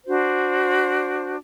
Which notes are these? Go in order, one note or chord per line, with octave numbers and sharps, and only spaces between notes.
D4 F#4 C5